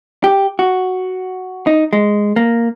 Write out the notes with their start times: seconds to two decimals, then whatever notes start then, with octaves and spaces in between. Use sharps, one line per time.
0.24 G4
0.59 F#4
1.67 D#4
1.93 G#3
2.36 A#3